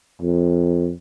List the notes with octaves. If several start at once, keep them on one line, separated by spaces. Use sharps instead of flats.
F2